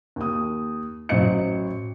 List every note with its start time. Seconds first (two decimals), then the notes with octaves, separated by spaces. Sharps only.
0.16 D#2 D#6
1.09 A1 F#3 C5 D#5 C#7